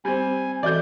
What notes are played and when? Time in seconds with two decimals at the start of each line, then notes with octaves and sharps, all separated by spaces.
0.05 G3 C4 G#5
0.63 E3 F#4 A4 D5 G6